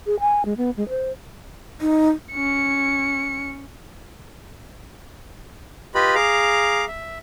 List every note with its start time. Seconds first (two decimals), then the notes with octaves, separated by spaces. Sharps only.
0.06 G#4
0.20 G#5
0.45 G#3
0.57 B3
0.77 G#3
0.89 C5
1.81 D#4
2.32 C#4 C#7
5.95 F4 G4 B4 D#5 B5
6.15 G#4 F5 A#5 D6
6.88 E5